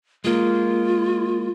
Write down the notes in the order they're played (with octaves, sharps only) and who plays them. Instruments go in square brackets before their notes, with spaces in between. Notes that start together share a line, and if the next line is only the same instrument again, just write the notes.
[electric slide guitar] G#3 A#3 [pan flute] F4